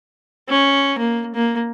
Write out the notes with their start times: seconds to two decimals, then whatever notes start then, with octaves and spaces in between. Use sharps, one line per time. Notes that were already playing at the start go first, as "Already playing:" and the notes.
0.49 C#4
0.98 A#3
1.34 A#3